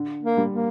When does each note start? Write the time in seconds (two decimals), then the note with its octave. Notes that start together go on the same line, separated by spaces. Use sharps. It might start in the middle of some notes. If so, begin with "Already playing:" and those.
Already playing: D3
0.23 A#3
0.37 G3
0.52 A#3